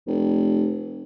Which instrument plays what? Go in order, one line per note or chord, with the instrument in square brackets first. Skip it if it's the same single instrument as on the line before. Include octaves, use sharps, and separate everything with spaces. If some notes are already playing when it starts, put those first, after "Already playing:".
[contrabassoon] F1